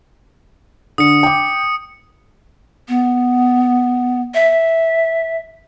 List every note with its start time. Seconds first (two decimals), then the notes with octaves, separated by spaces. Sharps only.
0.98 D3 D#6 C#7
1.23 G5 D6
2.89 B3
4.34 E5